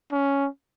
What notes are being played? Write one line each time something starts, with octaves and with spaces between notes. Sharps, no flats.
C#4